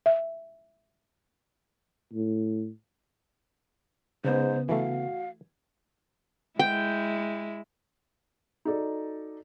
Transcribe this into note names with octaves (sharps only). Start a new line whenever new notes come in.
E5
A2
G#2 C#3 B3 C5
E3 A3 F#4 F5
G#3 E4 G5
D#4 F#4 A4 D5